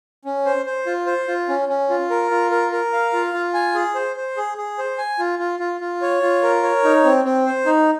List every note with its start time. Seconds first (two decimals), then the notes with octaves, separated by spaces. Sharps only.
0.25 C#4
0.45 C5
0.66 C5
0.86 F4
1.07 C5
1.28 F4
1.49 C#4
1.69 C#4
1.90 F4
2.10 A#4
2.31 F4
2.51 A#4
2.72 A#4
2.93 F5
3.13 F4
3.34 F4
3.54 G#5
3.75 G#4
3.95 C5
4.16 C5
4.37 G#4
4.58 G#4
4.78 C5
4.98 G#5
5.19 F4
5.39 F4
5.59 F4
5.81 F4
6.02 C#5
6.22 F4
6.43 A#4
6.63 C#5
6.84 D#4
7.04 C4
7.25 C4
7.46 C5
7.66 D#4